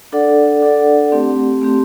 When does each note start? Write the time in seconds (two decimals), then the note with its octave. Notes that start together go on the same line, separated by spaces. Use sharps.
0.12 D4 A4 D5 F#5
0.62 D4 A4 D5 F#5
1.12 A3 C4 G4
1.62 A3 C4 G4